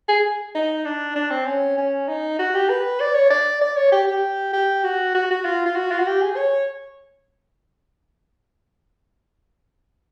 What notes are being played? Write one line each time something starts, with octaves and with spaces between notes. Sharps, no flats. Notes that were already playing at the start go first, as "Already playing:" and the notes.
G#4
D#4
D4
D4
C4
C#4
C#4
D#4
F#4
G4
B4
D5
C#5
D5
D5
C#5
G4
G4
G4
F#4
F#4
F#4
F4
F4
F#4
F4
F#4
G4
G#4
C#5